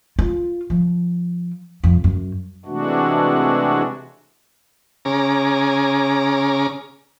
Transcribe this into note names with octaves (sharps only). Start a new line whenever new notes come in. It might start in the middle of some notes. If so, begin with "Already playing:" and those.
F4
F3
F2
F#2
C3 E3 G#3 A3 D4 F#4
C#3 C#4 G#4 A#5 D6